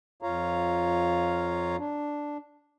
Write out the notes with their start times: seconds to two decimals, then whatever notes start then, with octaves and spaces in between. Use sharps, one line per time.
0.23 F2 F4 C#5 F5 A#5
1.78 D4